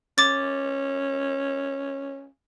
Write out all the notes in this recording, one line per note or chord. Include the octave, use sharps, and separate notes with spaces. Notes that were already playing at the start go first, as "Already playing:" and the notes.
C#4 D6 A6